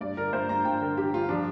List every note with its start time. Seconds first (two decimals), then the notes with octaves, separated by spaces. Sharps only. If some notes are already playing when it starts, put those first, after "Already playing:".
0.01 G2 D5
0.16 D3 A#4
0.33 G2 C5
0.49 G2 A#5
0.65 G2 G5
0.81 D3 A#4
0.97 D3 G4
1.13 G2 F4
1.29 F3 D4